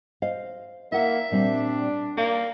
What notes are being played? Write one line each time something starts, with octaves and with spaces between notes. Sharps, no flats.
C5 D#5 F5
A#3 E4 E5 F#5
A#2 G3 C4 D4
A#3 F5